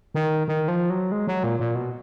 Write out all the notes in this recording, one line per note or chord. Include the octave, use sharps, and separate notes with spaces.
D#3
D#3
F3
F#3
G#3
F#3
A#2
A#2
B2